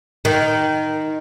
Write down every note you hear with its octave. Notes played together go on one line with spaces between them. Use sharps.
D#3